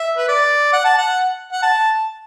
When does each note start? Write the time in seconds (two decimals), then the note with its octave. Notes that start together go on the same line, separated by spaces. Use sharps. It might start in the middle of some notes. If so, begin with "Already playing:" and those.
Already playing: E5
0.17 B4
0.28 D5
0.73 F#5
0.85 A5
0.98 F#5
1.52 F#5
1.62 A5